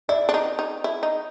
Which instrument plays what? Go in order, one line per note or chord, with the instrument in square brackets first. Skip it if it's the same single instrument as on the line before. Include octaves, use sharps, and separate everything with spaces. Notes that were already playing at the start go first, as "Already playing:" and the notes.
[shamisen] E4 [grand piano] D5
[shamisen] D4
D#4
D#4
E4
D#4